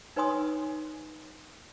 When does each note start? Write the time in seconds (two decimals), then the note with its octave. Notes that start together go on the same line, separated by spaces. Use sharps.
0.16 D#4 B4 C#5 G#5 C6 D#6